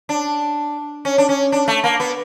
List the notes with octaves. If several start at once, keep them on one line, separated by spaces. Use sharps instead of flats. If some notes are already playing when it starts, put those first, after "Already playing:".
D4
C#4
D4
C#4
D4
A3
A#3
B3